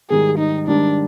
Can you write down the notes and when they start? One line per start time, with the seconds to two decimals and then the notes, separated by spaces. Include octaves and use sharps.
0.10 G#2 D#3 G3 G#4
0.38 D#4
0.67 G#2 D#3 G3 D4